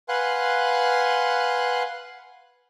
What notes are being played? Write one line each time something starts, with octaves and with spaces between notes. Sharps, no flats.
B4 F5 F#5 G#5 C6 F#6